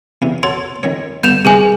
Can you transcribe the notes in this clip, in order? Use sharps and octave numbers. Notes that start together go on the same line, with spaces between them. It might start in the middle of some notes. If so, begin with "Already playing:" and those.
E2 C3
F#4 A4 C#5 C6
F2 D#3 C#5
G2 D3 B3 G6 E7 F7
G2 C3 D#3 G#4 B4 G#5